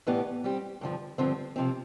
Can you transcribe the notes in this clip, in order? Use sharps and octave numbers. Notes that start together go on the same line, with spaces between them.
A2 E3 B3 D4 G4
G3 C4 G4
G2 D3 F3
G2 D3 F3 C4
C3 F3 C4